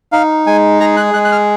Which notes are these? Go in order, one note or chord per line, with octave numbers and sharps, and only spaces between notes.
D#4 F5
G#3 G#5
G#4 A#5
F#6
G#3 F#6
F#6
F6